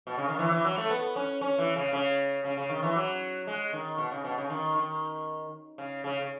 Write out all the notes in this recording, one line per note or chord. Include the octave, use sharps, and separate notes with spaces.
B2
C#3
D#3
E3
E3
F#3
A3
B3
C#4
C#4
E3
C#3
C#3
C#3
C#3
D#3
E3
F#3
G#3
D#3
B2
C#3
B2
C#3
D#3
D#3
C#3
C#3
C#3